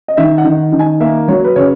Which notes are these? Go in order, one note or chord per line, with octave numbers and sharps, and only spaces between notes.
D#5
D#3 E5
F#5
D#3
D#3
G#5
A#3 E5
F#3 C#5
B4
C#3 C#5